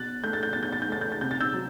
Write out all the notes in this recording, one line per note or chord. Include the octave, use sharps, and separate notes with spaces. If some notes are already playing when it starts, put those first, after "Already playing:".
Already playing: B2 F#6 A6
A3 G6
A6
G6
B2 A6
G6
A6
G6
A3 A6
G6
A6
C3 G6
A6
E6 G6
F#3